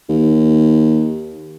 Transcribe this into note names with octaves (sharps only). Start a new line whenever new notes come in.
D#2